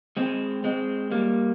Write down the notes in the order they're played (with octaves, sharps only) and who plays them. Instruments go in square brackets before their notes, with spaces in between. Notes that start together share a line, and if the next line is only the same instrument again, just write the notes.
[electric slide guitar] G#3 C4
G#3 C4
G3 A#3